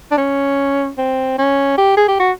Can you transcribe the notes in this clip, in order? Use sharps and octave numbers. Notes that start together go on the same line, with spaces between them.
D4
C#4
C4
C#4
G4
G#4
G4
F#4